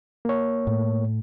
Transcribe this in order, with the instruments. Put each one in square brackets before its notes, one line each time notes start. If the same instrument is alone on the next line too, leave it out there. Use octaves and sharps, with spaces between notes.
[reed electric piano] A#3 C#5
[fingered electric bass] A2